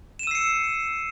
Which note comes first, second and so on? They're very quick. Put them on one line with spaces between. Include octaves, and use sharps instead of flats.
E7 D#7 E6 C7 C#7